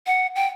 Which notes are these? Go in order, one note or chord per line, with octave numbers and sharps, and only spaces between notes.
F#5
G5